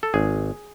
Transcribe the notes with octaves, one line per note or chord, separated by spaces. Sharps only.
A4
G#1 G#4